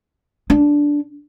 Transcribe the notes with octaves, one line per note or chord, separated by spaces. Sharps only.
D4